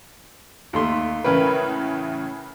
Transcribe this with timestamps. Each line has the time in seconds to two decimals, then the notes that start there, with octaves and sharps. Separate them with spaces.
0.73 D#2 A3 C6
1.24 A2 C#3 E3 A#4 B4